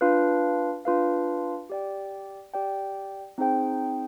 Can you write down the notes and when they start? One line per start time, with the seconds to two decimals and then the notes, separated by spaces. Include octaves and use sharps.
0.01 D4 F4 B4 F5
0.85 D4 F4 B4 F5
1.70 G4 D5 G5
2.54 G4 D5 G5
3.38 C4 D#4 G#4 C5 G5